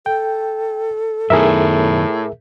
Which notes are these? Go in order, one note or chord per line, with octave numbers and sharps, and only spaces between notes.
A4 G5
F#2 A2 D#3 B3 G#4 A#4 E5